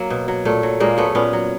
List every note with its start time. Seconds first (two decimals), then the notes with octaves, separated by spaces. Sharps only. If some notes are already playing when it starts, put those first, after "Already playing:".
Already playing: F#3 A#3
0.10 B2
0.28 F#3
0.45 A#2 A3
0.63 F#3
0.80 A#2 G#3 A#3
0.97 F#3 A3 B3
1.15 A#2 B3 C#4
1.33 F#3